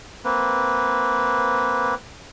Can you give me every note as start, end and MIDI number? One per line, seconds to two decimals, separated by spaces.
0.25 1.95 58
0.25 1.95 60
0.25 1.95 71